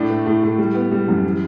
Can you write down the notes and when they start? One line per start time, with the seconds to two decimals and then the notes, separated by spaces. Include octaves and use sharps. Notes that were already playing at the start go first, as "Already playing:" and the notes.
Already playing: A2 D4
0.10 A3
0.26 A2
0.43 A2
0.58 G3
0.74 B3
0.91 G3
1.08 F#2
1.24 E3